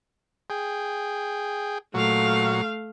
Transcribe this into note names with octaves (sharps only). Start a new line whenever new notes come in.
G#4 G5
A#2 F#3 A3 F#4 F5